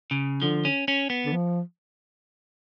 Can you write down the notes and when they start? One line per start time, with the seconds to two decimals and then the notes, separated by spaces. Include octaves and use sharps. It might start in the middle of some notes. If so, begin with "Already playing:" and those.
0.11 C#3
0.41 D3 F3
0.65 C#4
0.88 C#4
1.10 B3
1.25 D3
1.33 F3